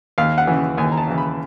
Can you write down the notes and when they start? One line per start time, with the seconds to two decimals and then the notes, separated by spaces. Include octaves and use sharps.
0.18 D#2 F5
0.38 F#5
0.47 C#3 E3
0.78 D#2 G#5
0.92 A#5
0.97 A5
1.07 C#3 E3
1.18 B5